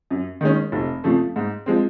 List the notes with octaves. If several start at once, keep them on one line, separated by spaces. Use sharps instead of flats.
F#2
D#3 G#3 C#4
F1
F2 C#3 F3 A3
G#2
F3 G#3 C4